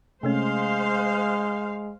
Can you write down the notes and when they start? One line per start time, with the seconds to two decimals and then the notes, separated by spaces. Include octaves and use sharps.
0.23 C3 G#3 A3 C#4 C5 F5